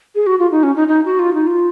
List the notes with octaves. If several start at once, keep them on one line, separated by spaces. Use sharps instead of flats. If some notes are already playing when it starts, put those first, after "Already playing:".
G#4
F#4
F4
D#4
C#4
D#4
D#4
F#4
F4
D#4
F4